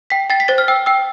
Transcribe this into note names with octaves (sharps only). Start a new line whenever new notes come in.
G5 B6
G5 A6
B6
C5 A6
F6
G5 E6
G5 E6